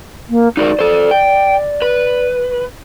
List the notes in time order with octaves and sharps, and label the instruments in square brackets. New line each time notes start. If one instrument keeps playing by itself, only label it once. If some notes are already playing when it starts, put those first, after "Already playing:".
[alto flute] A#3
[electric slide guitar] D#4 F#4 A#4 [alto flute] D5
[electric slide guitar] A4 C5
G5
B4